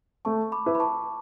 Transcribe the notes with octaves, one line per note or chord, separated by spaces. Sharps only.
A3 A5 C#6
B5 D6
E4 B4
B5
A5 C#6